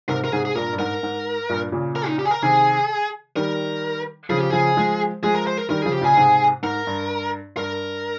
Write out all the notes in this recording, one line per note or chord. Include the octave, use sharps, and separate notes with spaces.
G#2 C3 A#4
A#4
G#2 C3 G#4
G#4
G2 A#2 A#4
G2
G#2 A#4
G#2
G2 A#2
A#2 C#3
A#4
D#4
G4
G#4
A#4
C3 D#3 G#4
D#3 G3 A#4
C#3 F3 G#4
G4
C#3 F3 G#4
F3 G#3
F3 G#3 G#4
A#4
C5
A#4
D#3 G3 A#4
C#3 F3 G#4
G4
A#2 C#3 G#4
G#2 C3
G#2 A#4
G2
G2 A#4